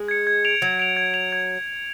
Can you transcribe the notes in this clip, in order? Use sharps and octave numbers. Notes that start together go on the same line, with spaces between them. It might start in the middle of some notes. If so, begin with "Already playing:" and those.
Already playing: G#3
G#6 C#7
G#6
D7 F7
F#3 G#6
D7 F7
G#6
D7 F7
G#6